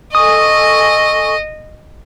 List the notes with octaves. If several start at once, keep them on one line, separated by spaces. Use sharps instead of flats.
A4 D#5 G#5 C#6 D#6